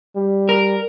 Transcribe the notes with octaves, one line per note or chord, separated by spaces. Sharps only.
G3
A#4